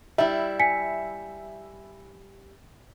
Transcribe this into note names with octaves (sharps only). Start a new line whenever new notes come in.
G3 E4 E5
G#5 B6 C#7